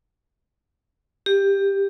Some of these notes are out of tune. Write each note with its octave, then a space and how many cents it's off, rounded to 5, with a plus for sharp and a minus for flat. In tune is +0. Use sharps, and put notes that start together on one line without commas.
G4 +10